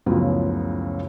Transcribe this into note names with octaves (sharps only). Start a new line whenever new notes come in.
C#2 F#2 A2 C#3 F3 B3